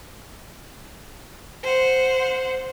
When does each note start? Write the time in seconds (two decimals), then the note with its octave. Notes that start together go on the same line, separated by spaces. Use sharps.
1.63 C5 F#5